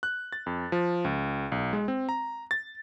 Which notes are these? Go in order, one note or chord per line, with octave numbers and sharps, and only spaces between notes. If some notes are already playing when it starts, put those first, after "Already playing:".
F#6
A6
F2
F3
C#2
B1
G#3
C4
A#5
A6